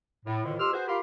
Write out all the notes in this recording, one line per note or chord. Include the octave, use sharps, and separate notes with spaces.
A2
F2 A2 D3 D#3
F2 G4 C6 E6 F6
F#4 G#4 B4 C5
F4 G4 A#4 F5 B5 C6